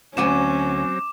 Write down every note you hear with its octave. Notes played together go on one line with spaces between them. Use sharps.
D2 F#3 C4 C#4 F#5 G#5 D6 E7